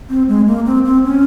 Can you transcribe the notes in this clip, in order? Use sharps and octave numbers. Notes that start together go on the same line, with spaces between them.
C4
G#3
A#3
C4
C4
C#4